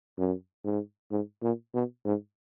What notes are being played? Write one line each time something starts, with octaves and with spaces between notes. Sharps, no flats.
F#2
G#2
G#2
A#2
B2
G#2